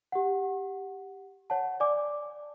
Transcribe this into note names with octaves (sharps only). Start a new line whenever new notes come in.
G4 F#5
C#5 F#5 A5
D5 G#5 D6